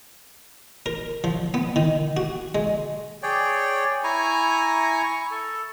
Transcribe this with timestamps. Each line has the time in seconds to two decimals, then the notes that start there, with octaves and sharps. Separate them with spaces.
0.86 A#4
1.24 F3
1.54 B3
1.76 D#3
2.17 F#4
2.55 G#3
3.23 G#4 C#5 D5 G5
4.04 E4 G#5 A#5 C#6
5.04 C#6
5.31 A4